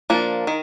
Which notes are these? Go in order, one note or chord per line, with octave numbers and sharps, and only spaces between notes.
F3 A#3 D4
D#3